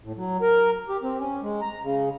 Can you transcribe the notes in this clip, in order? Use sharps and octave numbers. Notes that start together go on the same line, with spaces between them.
A2
F#3
A#4
G4
C4
C#4
G#3
A#5
C#3